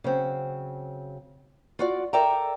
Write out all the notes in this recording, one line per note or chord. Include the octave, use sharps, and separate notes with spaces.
C#3 F#3 C4
F4 F#4 D5
A4 A#4 D5 E5 G5 A#5